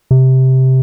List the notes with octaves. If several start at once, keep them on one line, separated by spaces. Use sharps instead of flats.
C3